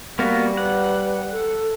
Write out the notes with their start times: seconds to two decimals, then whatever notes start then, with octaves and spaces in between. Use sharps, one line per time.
0.19 G3 A#3 B3 F#4
0.57 B4 F#5
1.32 A4